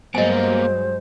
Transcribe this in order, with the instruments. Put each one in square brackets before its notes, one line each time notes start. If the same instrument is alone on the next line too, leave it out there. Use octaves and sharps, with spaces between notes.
[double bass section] G2 F#3 G#3 [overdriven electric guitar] B2 A#3 [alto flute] C5 [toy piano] D#5 G#5